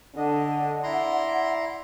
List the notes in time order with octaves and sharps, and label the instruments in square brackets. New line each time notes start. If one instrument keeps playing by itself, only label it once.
[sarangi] D3 [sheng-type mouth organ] D4 D#5 [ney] F#5
[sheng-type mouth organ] E4 A#5 C6 [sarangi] D5